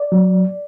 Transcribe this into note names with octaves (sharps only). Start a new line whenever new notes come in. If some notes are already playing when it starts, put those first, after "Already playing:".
Already playing: D5
F#3